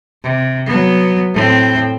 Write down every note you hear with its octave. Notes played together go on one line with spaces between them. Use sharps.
C3
F#3 B3
A2 C4